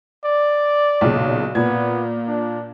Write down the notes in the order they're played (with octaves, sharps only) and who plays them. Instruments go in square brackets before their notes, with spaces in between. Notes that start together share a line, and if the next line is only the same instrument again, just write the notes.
[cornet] D5
[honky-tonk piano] B1 A#2 C#3
[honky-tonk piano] A#2 G#6 [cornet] B3
[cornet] D4